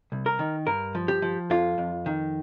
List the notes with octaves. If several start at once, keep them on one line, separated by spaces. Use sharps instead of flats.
C2
A#4
D#3
G2 A#4
F3
G4
F3
F2 F4
F2
D#3